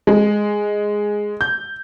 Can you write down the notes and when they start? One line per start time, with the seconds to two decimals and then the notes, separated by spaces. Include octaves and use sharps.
0.07 G#3
1.41 G6